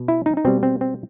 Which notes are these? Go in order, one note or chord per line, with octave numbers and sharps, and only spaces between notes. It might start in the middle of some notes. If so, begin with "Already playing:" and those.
Already playing: B2
E4
D#4
D#4
B2 G3 C4
C4
C4